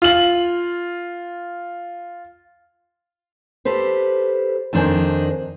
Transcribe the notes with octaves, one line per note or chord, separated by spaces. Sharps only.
F4 F#7
G4 A4 B4 C5
F2 D#3 D4 D#4 C5 G#5